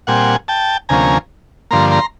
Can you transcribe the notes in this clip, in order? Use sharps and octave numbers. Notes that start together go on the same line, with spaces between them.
A#2 G3 C4 F#5 G#5
G5 A5
D2 C3 F3 A#3 C#4 G#5 A#5
G2 D3 F3 A#3 A#5 C6
A#5 C6